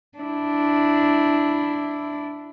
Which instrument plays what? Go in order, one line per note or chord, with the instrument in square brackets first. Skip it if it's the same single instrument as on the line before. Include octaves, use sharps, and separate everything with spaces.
[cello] D4 E4